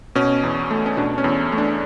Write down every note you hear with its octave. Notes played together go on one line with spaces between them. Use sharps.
B2 C#4
E2
A3
C#4
B2 D4
C#4
E2
A3
D4